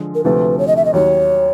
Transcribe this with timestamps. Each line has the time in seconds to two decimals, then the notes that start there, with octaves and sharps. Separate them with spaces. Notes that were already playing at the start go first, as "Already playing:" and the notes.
Already playing: D3 F3 G#3
0.15 A#4
0.24 D2 C3 F3 A3 B4
0.59 C#5
0.68 D#5
0.76 E5
0.85 D#5
0.93 D#2 D#3 F#3 C#5